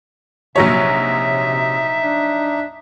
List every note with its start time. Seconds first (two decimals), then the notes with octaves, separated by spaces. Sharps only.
0.56 A#1 C3 F#3 D#4 C#5 E5
2.00 D4